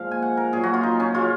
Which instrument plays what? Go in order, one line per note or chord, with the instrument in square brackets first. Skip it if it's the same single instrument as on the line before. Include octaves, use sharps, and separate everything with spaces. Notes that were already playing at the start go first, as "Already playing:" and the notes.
Already playing: [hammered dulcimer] A#2 F3 G#3 F5
G#5
F#5
A#4
A#2 F#3 G#4
F#4
F4
D#4
C#4
C#3 F#3 F4